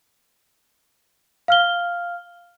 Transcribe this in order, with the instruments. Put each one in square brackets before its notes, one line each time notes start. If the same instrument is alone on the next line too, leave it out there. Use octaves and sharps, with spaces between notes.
[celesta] F5 F6 G7